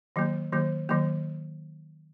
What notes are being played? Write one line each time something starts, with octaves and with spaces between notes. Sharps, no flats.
D#3 F#3 A#3
D#3 F#3 A#3
D#3 F#3 A#3